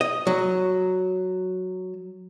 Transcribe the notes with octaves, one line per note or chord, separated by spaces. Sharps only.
D#5
F#3